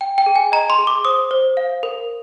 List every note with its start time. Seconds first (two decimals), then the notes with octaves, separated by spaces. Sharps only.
0.01 G5
0.18 G5
0.26 G#4
0.36 G#5
0.52 D#5 A#5
0.70 C6
0.78 G#4
0.87 D6
1.05 C5 D#6
1.31 C5
1.57 F5
1.83 A#4